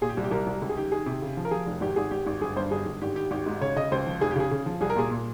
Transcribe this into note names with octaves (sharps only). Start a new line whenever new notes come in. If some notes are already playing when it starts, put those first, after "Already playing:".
A#2 G#4
G4
C2
G4
C2 A#4
C2
C#2
G#4
D#3 G4
D#3 G#4
C3
C#3
F3
A#4
F3 G#4
F1
G#1 G4
G#1 G#4
G#1 G4
G#1
G1 G#4
G2 C5
G1 G#4
G1
G#1 G4
D#3 G4
G#1 G4
G#2
C#3 C#5
C#3 D#5
C#2 C5
F3
F1 G#4
G4
C#3 G#4
C#3
F3
C2 G#4
A#4
A#2 G#4
A#2